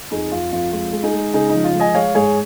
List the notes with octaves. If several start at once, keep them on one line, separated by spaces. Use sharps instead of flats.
F2 D#4 G#4
F2 F4
F2 F4
G#3 F4
G#3
D#4 G#4
G#3
C#3 D#4 G#4
F3 D#4
F4
G#3
D#5 G#5
G#3 C#5 F5
G#2 G#4 C#5